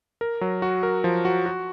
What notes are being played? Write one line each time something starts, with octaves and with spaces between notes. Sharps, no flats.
A#4
F#3
F#4
A#4
F3
F#4
F#4